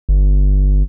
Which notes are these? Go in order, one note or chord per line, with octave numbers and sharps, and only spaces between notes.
G1